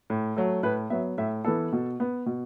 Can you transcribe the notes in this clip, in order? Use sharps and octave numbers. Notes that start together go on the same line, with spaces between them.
A2
F#3 A3
A2 B4
F#3 B3 E5
A2 E5
E3 B3 A4
B2
B3
B2